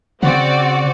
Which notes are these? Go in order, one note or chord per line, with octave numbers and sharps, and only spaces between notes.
C#3 C4 F#4 D5 F#5